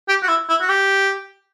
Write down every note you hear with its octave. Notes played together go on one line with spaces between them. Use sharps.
G4
F#4
E4
E4
F#4
G4